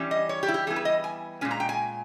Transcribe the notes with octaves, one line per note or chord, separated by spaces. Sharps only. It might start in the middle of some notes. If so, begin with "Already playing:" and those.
Already playing: E3 G3 C#4
D#5
C#5
G4
E4
G4
E3 G3 B3 E4 G#4
B4
D#5
G#5
A#2 G#3 C#4 G#5
A#5
G5
G#5